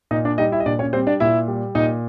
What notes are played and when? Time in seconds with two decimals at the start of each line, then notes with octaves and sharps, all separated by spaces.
0.11 A#2 D#4 D#5
0.25 D4 D5
0.38 G3 D#4 D#5
0.52 E4 E5
0.60 D#5
0.66 A#2 D4 D5
0.79 C#4 C#5
0.93 G3 C4 C5
1.07 D4 D5
1.20 A#2 E4 E5
1.48 G3
1.75 A#2 D#4 D#5